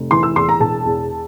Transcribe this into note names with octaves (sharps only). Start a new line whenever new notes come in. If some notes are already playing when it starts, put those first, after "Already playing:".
Already playing: F1
E3 C6
E6
E2 C6
A#5
E1 A5
E2